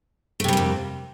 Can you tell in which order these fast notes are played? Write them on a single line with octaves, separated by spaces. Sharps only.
A3 C3 G3 A#3 F2